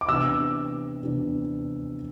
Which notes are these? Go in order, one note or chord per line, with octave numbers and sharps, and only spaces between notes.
D6
C3 E3 B3 D4 E6
C3 E3 B3 D4